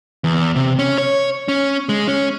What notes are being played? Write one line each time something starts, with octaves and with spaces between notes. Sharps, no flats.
E2
C3
C#4
C#5
C#4
G#3
C#4